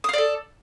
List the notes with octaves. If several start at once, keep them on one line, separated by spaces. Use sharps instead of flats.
A4 D5 F5 D#6